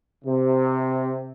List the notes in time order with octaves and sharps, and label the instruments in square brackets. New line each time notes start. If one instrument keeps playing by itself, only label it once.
[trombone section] C3